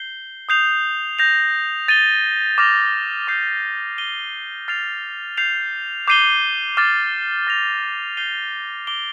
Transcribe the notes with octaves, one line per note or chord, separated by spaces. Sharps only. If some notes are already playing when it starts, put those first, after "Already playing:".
Already playing: G6 C7 G7
D#6 G6 C7 F7
G6 A#6 F7
A6 D#7 G7
D6 F6 A#6 F7
D6 G6 C7
A6 D#7 G7
F6 A6 C7 F7
G6 C7 F7
D6 G6 C7 D#7 G7
D6 F6 A6
F6 A#6 F7
G6 C7 D#7 G7
D6 F6 A#6 D7 G7